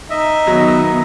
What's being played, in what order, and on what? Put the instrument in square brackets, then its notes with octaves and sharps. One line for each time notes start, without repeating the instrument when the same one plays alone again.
[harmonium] D#4 [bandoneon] D#5 E5
[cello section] D#3 B3 [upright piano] F#3